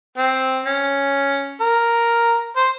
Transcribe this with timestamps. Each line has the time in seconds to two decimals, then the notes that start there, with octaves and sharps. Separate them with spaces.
0.18 C4
0.66 C#4
1.61 A#4
2.56 C5